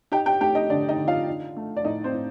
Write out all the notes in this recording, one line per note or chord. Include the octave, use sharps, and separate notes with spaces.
D#4 G4 G5
G4 G5
A3 G4 G5
D#4 D#5
D3 D4 D5
D#4 D#5
D3
F4 F5
D#4
A3
D5
A2 D#4 D#5
C4 C5
A2